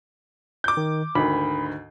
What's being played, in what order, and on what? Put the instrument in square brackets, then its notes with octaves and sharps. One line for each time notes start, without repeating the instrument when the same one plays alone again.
[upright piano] D6 G6
[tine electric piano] D#3
[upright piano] D2 G#2 D#3 [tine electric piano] B5